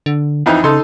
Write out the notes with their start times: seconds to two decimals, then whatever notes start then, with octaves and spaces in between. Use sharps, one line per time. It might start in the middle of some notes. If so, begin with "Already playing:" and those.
0.06 D3
0.46 F2 E3 D#4
0.64 C#3 D#4 A4 C6